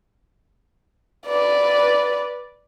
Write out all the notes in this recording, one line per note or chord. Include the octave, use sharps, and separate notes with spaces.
B4 D5